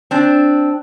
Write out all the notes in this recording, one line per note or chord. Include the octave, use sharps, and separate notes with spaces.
C4 D4